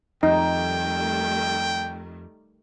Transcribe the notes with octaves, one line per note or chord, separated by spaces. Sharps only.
F2 D#3 G3 A3 D#4 G5